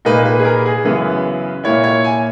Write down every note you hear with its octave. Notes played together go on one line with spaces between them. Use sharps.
A#2 A#3 D#4 B4
B4
G#4
A#4
G#4
F#2 C#3 E3 B3 B4
A#2 A#3 E4 C#5
C#5
G#5